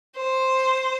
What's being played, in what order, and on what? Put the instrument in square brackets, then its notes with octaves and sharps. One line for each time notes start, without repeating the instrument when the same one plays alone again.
[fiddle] C5